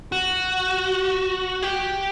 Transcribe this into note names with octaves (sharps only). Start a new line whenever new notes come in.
F#4
G4